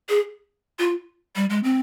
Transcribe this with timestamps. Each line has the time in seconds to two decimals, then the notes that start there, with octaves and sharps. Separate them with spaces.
0.09 G#4
0.79 F4
1.36 G3
1.50 G#3
1.64 C4